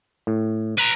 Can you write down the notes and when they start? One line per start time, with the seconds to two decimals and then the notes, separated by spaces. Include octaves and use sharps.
0.27 A2
0.78 B4 A#5